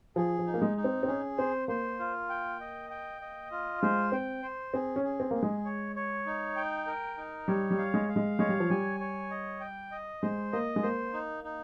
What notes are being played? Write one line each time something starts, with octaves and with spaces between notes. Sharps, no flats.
F3 G#4
F3
D#4
A#3
G#3
D#4
C4
C4
C#4 G#4
C4 C5
A#3 C5
F4
G5
D#5
G5
D#5
F4
G#3 C5
C4 G5
C5
C4 G#4
C#4
G#4
C4
A#3 G#4
G#3
C#5
C#5
D#4
G5
A#4
D#4
G3 C#5
G3
F5
G#3
F5
G#3
G#3 C#5
G3
F3
G3 G#5
C#5
D#5
G5
D#5
G#3 C5
A#3 D#5
G#3
A#3 C5
D#4
D#4